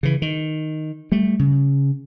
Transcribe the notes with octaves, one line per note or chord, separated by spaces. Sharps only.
C#3 E3
D#3
G3 A3
C#3